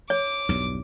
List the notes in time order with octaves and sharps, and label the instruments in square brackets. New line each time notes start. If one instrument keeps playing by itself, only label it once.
[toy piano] C#5 [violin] D6
[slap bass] B1 E2 G2